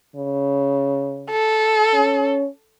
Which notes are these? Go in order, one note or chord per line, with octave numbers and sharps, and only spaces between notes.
C#3
A4
C#4